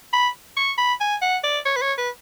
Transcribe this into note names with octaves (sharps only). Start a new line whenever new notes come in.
B5
C#6
B5
G#5
F#5
D5
C#5
B4
C#5
B4